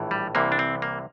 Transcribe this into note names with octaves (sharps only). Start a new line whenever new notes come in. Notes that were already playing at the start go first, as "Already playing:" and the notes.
Already playing: A#1 A2 E3
G3
C2 C3 E3 A#3
D4
C4
A#3